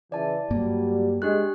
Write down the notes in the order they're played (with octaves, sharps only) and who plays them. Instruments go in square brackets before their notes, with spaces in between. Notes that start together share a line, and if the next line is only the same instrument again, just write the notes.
[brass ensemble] C#3 E3 [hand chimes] D5 A5
[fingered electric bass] G2 A#3 [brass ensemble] F#3 G3
[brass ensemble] G#3 [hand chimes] D4 G4 F#6